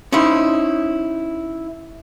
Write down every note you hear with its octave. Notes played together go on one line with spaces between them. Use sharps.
C#4 D#4 E4 C5